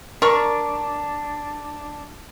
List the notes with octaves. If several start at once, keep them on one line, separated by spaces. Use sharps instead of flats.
D4 A#4 C#6